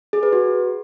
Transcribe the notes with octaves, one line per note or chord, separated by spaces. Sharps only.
G#4
B4
F#4